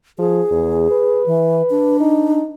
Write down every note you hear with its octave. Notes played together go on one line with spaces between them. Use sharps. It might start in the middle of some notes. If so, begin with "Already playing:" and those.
F3 G#4
E2
B4
E3
D4
D#4